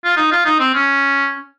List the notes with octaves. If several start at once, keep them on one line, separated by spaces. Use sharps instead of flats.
F4
D#4
F4
D#4
C4
C#4